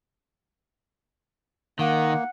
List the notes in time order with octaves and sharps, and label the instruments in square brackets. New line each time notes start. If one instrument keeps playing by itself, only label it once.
[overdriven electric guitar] D#3 [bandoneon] A#3 [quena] F#5